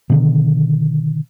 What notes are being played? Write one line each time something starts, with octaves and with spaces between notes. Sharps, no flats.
B2 D3 D#3